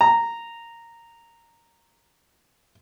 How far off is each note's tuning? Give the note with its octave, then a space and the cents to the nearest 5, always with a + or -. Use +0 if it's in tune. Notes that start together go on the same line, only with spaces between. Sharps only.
A#5 -10